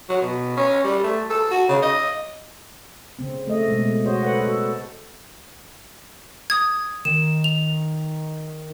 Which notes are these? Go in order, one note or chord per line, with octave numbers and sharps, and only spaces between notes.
F#3
B2
C#4
G3
A3
A4
F#4
C#3
D#5
C#3 C4
A3 D#5
B2 G#3
F#4 C5 C#5 D#5
A4 B4 C#5 F#5
F#4 A4
D#6 G#6
D#3 E7
F7